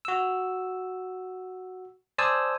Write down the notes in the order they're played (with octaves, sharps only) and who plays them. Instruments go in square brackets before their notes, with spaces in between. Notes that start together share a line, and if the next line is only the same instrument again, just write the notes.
[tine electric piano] F#4 E6
C5 D5 G#5 A5 D#6 E6